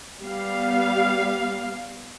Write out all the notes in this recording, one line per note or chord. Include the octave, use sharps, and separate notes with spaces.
G3 B3 F5